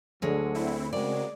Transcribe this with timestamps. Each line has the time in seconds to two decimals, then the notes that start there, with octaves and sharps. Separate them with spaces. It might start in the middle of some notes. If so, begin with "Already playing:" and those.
0.22 D2 D3 F#3 G#3 C#5
0.54 C4 E4
0.93 C#3 G#3 C4 F#4 A#4 D5